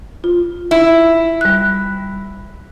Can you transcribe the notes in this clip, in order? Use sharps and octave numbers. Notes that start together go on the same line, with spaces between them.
F4
E4
G3 F#6